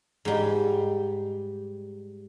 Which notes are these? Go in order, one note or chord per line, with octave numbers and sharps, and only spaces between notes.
G#2 G3